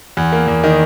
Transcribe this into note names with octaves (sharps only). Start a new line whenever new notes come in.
E2
A#3
E2
D#3